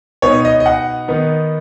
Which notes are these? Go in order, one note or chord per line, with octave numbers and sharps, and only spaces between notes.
B2 B3 D#4 C#5
D#5
D#5
F#5
D#3 B3 D#4